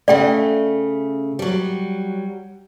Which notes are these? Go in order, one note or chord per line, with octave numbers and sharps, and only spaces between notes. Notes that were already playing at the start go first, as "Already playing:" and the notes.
C#3 A3 D5 G5
F#3 G3